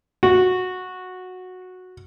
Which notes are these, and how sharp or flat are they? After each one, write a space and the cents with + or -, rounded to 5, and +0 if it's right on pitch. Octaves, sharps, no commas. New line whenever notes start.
F#4 -10